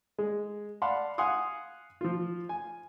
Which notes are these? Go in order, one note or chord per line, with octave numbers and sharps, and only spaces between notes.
G#3
D5 F5 F#5 A5 B5 C6
F5 F#5 G#5 C6 D#6
F3 F4
G#5